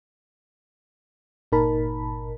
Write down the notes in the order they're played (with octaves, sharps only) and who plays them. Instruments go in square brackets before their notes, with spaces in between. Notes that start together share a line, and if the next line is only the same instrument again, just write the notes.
[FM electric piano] G1 A#2 D#4 A#4 A5 B5